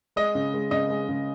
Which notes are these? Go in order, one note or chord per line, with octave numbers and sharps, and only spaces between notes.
G#3 D#5
C#3
G#3
C#3 D#5
G#3
C#3